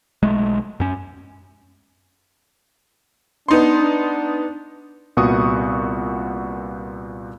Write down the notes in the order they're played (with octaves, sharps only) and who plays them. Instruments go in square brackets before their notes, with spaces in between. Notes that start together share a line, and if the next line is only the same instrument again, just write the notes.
[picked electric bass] B1 G#3 A3
F#2 C#4
[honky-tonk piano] B3 D#4 C6 [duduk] D4
[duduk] D4
[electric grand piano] C2 A#2 B3 F#4 C#6 D#6